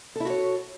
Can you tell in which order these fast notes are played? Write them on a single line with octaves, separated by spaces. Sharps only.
A4 E4 F#4 C#5